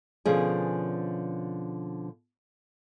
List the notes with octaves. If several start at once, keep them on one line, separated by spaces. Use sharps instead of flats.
B2 D3 F3 C#4 G#4